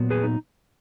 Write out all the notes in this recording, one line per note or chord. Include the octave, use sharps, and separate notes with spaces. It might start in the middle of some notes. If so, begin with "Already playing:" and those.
Already playing: A#2 F#3 B3
G#4 B4
D#4